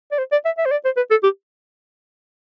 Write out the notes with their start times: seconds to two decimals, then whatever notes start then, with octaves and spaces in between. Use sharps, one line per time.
0.12 D5
0.18 C5
0.32 D5
0.45 E5
0.58 E5
0.66 C5
0.71 D5
0.85 C5
0.97 B4
1.11 A4
1.23 G4